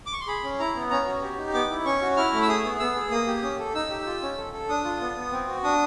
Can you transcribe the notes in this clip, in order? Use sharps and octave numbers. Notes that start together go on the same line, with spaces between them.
D6
C#6
C6
G#4 B5
C#4
E4 A#5
B3
C#4 A#5
F#4
G4
D#4
B3 D6
E4
C#4 C#6
F#4
E4 F6
A3
E6
G#4 D#6
B3
B3 E6
G#4
A#3 D#6
G4
C#4
A4
D#4 E6
G4
F4
C#4
A4
A4
D4 D#6
F4
B3
B3
C4
F#4
D4 D#6